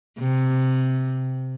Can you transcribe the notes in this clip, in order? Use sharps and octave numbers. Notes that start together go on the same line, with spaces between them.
C3